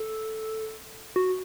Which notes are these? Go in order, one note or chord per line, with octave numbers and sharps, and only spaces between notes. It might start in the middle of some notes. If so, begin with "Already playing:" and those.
Already playing: A4
F#4